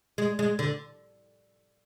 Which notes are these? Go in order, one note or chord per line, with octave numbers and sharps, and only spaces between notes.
G#3
G#3
D3